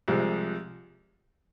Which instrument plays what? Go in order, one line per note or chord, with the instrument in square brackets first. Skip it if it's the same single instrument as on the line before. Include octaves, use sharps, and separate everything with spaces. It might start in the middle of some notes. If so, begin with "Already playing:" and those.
[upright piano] C2 C3 F3 G#3